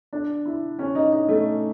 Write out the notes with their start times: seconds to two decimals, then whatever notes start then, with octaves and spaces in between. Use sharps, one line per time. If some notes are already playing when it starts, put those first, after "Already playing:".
0.13 D4
0.46 E4
0.79 C#4
0.95 D#4
1.12 D#4
1.28 A3